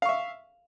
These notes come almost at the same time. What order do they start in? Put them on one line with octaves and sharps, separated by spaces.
F5 C#6 E5